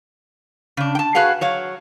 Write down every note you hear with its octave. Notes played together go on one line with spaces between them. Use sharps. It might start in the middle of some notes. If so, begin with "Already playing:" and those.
C#3 D4
G5 A5
F#4 G#4 B4 F5 F#5
F#3 C#5 F5